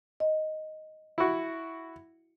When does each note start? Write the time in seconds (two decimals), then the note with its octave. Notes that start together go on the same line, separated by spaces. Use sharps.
0.20 D#5
1.18 E4 F#4